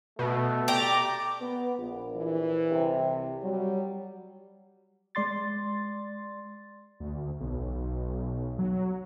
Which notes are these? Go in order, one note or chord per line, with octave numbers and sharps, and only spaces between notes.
B2 A3
G4 D5 A#5 D6
B3
A#1
E3
C2 C3
F#3 G3
G#3 D5 C6 A6
D2
B1
F#3